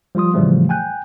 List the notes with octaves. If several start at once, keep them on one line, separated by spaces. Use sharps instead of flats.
F3 G3 F4 C6 D#6
A2 C#3 E3 F3 G3 A3
G5 G#5 F#6 G6